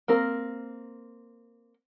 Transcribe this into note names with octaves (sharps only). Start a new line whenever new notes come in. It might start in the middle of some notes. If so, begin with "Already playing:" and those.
A#3 C4 A#4